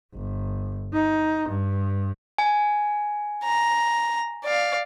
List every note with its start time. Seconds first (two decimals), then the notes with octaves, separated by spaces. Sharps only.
0.14 G1
0.93 D#4
1.48 G2
2.38 G#5
3.45 A#5
4.44 D5 F5